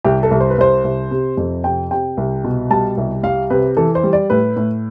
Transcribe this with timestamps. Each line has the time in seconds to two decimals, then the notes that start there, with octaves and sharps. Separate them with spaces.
0.05 C2 G4
0.23 A4
0.31 C2
0.40 C5
0.50 B4
0.58 C2 C5
0.84 C2
1.11 C3
1.37 F2
1.64 C3 G5
1.91 C3 G5
2.17 C2
2.44 B2
2.70 G3 A5
2.97 C2
3.23 G3 F5
3.50 C3 B4
3.77 E3 A4
3.95 C5
4.04 G3
4.13 D5
4.30 A2 B4
4.56 A2